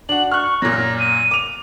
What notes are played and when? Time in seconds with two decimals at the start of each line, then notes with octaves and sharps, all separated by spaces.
0.09 D4 F#4 F#7
0.32 C#6 F6 F#6
0.62 F#2 A#2 A#6
0.99 D#7
1.31 D6 F7